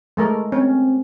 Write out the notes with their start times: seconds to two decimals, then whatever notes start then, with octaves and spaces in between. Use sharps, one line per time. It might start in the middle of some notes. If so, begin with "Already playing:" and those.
0.17 G#3 A3 A#4
0.52 C4 C#4